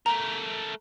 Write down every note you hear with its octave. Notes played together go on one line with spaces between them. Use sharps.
A3 A#4 A#5